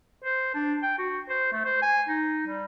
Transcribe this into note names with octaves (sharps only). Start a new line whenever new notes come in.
C5
D4
G5
F#4
C5
A3
C5
G#5
D#4
G3